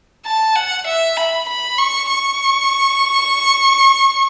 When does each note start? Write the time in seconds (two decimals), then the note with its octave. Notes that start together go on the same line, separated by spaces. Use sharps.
0.25 A5
0.55 F#5
0.87 E5
1.17 B5
1.48 B5
1.78 C#6
2.09 C#6